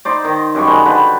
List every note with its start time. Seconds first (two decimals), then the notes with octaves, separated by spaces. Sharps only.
0.05 D#4 C5 D5
0.25 D#3
0.55 F#2 G3 C#6
0.67 G#3 C5
0.85 D3 B4 G5